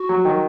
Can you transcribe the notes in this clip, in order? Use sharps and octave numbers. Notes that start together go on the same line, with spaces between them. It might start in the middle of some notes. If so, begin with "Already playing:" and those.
Already playing: F#4
F#3
D#3